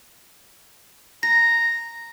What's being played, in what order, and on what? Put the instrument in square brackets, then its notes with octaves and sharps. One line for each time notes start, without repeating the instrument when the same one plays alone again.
[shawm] A#5 [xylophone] A#6